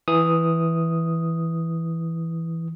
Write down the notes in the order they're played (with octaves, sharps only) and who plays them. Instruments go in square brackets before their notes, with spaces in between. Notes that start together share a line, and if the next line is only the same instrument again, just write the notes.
[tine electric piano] E3 D#6